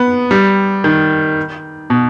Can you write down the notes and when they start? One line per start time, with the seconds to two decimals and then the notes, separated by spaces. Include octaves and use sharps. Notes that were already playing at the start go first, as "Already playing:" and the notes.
Already playing: B3
0.31 G3
0.84 D#3
1.90 B2